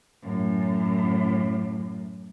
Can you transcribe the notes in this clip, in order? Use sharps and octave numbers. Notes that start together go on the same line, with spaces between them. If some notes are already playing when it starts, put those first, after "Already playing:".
F#2 A2